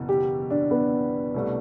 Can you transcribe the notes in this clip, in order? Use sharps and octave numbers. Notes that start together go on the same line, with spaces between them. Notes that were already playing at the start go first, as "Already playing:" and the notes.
Already playing: F#1 E2 B2
G4
D4
B3
C2 B2 A3 D4